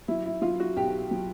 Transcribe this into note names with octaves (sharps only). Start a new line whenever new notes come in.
F#3 E4
E4
F#3 F4
F#4
B1 G4
F#3